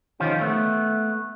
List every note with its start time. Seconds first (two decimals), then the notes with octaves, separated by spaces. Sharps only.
0.20 D#3 F3 C#4 F4 G4
0.41 A3 B3